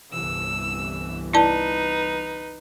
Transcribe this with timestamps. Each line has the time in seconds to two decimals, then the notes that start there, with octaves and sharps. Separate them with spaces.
0.12 G1 C2 E3 E6
1.33 D#4 E4 B4 D5 A5